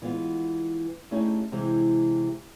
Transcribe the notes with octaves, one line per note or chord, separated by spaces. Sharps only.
E3 G#3 B3 F4
A3 C#4 D#4 E4 G4 G#4
C3 E3 G#3 G4